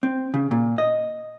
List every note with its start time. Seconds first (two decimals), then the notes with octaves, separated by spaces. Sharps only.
0.03 C4
0.34 C#3
0.51 A#2
0.78 D#5